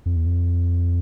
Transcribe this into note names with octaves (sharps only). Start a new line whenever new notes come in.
F2
E2
F2